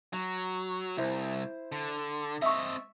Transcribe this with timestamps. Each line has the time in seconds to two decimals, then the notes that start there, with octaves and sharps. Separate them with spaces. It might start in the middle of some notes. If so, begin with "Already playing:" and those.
0.13 F#3
0.97 C2 E4 C5
1.72 D3
2.42 C4 D#5 E5 C#6